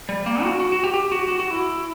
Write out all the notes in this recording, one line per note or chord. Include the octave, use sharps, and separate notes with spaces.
G3
A#3
F#4
F#4
F#4
G4
G4
F#4
F#4
F#4
E4